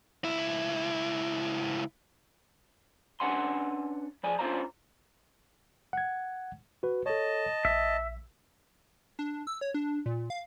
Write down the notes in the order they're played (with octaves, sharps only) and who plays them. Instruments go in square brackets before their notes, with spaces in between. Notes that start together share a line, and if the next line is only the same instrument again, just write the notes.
[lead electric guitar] C#2 E4
[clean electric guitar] C#4 D4 B4 F#5 G#5 C6
F3 D5 G#5
C#4 D4 F4 C5 F5 A#5
[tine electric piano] F#5 G#6
F#4 B4
[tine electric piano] A4 C#5 [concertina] D#5 A5
[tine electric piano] A#1 [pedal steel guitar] E5
[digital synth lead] D4
E6
C#5
D4
A#2
F5